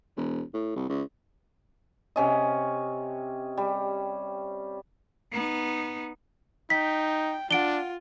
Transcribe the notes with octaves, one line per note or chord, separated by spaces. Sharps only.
E1
A2
C2
C#2
C3 C#4 D#5
G3
B3 D#4
D#4 G5 B6
D4 F4 F#5 D7 G7